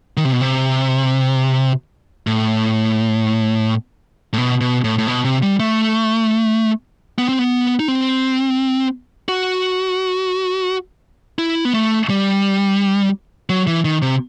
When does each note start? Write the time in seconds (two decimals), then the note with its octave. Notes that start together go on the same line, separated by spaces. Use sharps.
0.17 D#3
0.25 C3
0.33 B2
0.41 C3
2.27 A2
4.33 A2
4.38 B2
4.61 B2
4.84 A2
4.98 A2
5.07 B2
5.25 C3
5.42 G3
5.60 A3
7.18 B3
7.29 C4
7.39 B3
7.80 D#4
7.88 C4
9.28 F#4
11.38 E4
11.65 B3
11.74 A3
12.10 G3
13.49 F#3
13.67 E3
13.85 D#3
14.02 C3